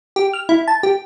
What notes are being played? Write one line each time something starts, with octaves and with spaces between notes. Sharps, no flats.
G4
F6
E4
A5
G4